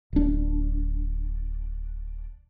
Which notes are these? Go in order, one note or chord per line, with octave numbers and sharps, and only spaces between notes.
D1 D4